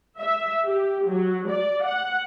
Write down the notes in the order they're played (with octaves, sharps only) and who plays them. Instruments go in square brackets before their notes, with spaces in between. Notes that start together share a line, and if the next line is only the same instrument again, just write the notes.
[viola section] E5
G4
F#3
D5
F#5